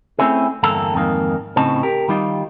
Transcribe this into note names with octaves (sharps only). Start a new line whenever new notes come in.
A3 C4 C#4 E4 G#4
E2 G2 D3 A#3 A4 A#5
F2 G#2 D#3 A#3
A2 C#3 C4 D#4 A5
G4 A#4
D#3 G3 D#4 F4